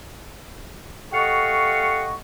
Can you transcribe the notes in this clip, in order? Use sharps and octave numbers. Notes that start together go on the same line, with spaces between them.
G4 A4 D#5 F5 F#5 C#6